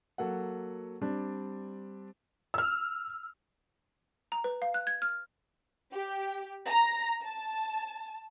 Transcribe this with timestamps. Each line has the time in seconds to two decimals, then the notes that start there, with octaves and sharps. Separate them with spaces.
0.18 F#3 A#3 A4 F#5
1.01 G3 C4 D4
2.54 E6 F6
4.32 A#5
4.44 B4
4.62 F5
4.74 F#6
4.87 G#6
5.02 F6
5.93 G4
6.68 A#5
7.24 A5